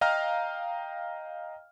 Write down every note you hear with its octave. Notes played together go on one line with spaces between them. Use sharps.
D#5 F5 G5 A#5 F6